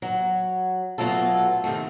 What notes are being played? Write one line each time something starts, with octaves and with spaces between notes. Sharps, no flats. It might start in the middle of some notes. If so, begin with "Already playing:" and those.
F#3
B2 F#3 A3 F4 A4
C3 D#3 E3 A3